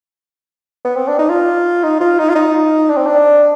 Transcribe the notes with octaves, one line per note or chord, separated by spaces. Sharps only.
B3
C4
D4
D#4
F4
D#4
F4
D#4
F4
D#4
D4
C4
D4